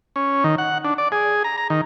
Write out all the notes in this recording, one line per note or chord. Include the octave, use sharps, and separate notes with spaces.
C#4
D#3
F#5
D4
D5
G#4
A#5
A#5
D#3